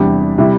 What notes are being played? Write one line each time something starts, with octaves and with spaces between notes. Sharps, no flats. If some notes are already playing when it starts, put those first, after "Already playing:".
Already playing: E2 C3 G3 D4 G4
C3 G3 E4